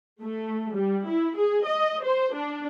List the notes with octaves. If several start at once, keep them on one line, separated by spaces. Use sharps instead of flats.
A3
G3
E4
G#4
D#5
C5
D4